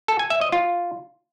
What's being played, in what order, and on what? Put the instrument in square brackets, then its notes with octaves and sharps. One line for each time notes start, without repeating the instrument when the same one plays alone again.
[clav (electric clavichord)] A4
G#5
E5
D#5
F4